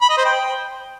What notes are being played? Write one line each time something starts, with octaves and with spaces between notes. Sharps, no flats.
B5
D#5
C5
G5